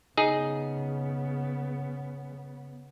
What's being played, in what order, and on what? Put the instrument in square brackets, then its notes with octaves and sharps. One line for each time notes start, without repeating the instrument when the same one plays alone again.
[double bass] C#3 B3 [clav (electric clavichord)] D#4 G#4